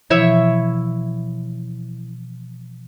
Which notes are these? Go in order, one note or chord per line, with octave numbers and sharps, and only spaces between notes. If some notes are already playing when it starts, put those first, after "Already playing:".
B2 E3 F3 E4 C#5 E5